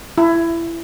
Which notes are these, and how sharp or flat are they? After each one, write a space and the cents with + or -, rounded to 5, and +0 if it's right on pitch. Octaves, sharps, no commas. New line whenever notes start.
E4 +20